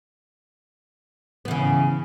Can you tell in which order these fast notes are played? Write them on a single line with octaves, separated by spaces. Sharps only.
B3 E3 C#3